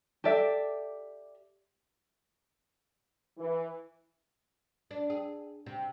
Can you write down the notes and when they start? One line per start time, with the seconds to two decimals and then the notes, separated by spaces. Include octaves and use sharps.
0.24 G4 A4 D5 E5
3.38 E3
4.91 D4
5.10 G#4
5.66 C3